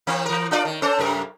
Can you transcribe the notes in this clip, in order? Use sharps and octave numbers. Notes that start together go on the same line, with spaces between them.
E3 A#3 C4
E3 A#4
D4 F4 D5
D#3
C#4 A4 C5
F#2 C3 A#4